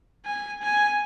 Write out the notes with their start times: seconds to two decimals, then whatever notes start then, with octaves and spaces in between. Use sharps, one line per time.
0.26 G#5
0.62 G#5